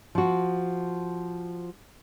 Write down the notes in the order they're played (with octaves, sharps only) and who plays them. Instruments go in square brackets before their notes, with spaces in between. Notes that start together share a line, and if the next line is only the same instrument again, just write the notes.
[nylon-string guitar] F3 F#4